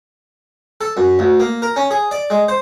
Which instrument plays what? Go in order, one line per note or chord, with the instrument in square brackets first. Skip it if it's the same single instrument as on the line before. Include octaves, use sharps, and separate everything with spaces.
[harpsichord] A4
F#2
D2
A#3
A#4
C#4
G#4
D5
G#3
C5